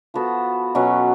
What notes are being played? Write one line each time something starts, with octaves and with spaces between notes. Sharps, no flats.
F3 B3 F#4 A4
B2 F#3 C#4